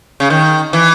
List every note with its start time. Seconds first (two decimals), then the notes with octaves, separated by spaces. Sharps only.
0.20 C#3
0.30 D#3
0.73 E3